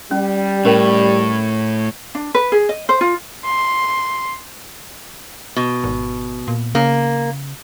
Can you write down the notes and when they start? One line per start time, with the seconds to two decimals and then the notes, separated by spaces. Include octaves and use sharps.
0.11 G3 C#4
0.65 A2 C#4 G4 A#4
2.15 D4
2.35 B4
2.52 G#4
2.69 D#5
2.89 C5
3.01 F4
3.45 C6
5.56 B2
5.84 G#1
6.48 A#2
6.75 C#3 A#3